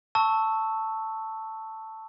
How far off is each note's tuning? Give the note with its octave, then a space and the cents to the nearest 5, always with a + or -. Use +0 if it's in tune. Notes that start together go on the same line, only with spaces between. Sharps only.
A5 +10 C#6 +0 E6 -10